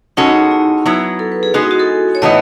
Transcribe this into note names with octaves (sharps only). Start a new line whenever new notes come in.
B2 G#3 C#4 D#4 F#4 A4
E4
F#3 B3 E4
A4
B4
G#4
G#3 B3 D#4 F#4 G#4
E4
F#4
A4
C#5
A2 E3 B3 D#4 D#5